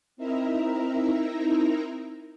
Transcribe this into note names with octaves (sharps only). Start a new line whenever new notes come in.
C4 D#4 E4 A#4 E5 A#5